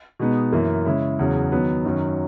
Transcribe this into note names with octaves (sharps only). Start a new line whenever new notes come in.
B2 G#3 B3 D#4
F#2 E3 A#3
C#3 G#3 C#4 E4
E2 C#3 F#3
D#3 F#3 B3
F#2 D#3 F#3 C#4